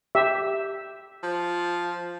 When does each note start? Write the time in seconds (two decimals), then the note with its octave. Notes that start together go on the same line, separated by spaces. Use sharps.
0.15 G4 E5
1.23 F3